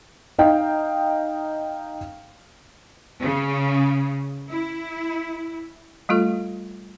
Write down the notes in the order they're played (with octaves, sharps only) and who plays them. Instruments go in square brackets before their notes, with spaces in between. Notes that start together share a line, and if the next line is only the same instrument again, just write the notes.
[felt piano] D#4 D#5 F5 G5
[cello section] C#3
E4
[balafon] G3 A3 F4 A4